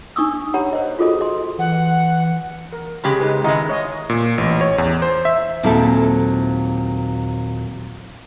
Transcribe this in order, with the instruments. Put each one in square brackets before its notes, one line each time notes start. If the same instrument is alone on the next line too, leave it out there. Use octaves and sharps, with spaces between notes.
[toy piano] D4 D#4 C#6 D#6 E6
G4 C#5 F#5 A#5 B5
C5 D#5
F4 F#4 G#4 A4 C5 D#5
D#5 C6
[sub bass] E3 [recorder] F#5
[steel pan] A#4
[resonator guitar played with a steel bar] C#3 G#3 G4 [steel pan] B5
[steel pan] D#4 B4 G#5
[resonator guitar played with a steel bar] D#3 G#3 [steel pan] E4 D#5 F#5
[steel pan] C#5 D#5
[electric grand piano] A#2
A1
C#5
E2
C5
E5
[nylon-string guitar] D#2 A#2 F#3 C4 E4 A4